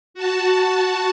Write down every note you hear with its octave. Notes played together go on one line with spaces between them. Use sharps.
F#4 A5